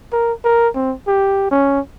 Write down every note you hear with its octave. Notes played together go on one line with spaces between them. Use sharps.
A#4
A#4
C4
G4
C#4